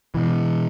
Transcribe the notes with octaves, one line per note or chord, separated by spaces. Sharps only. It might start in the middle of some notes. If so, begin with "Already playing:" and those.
B2 E3